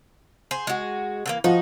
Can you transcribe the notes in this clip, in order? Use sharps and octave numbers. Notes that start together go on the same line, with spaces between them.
G#4 C5
G#3 F#4
D3 E3 A#3
F3 D#4 F#4